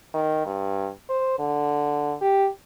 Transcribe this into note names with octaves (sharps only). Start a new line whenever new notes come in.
D#3
G2
C5
D3
G4